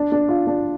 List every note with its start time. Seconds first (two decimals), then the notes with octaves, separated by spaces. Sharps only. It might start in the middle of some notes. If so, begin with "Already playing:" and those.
Already playing: D4
0.12 D4
0.29 F4
0.47 D4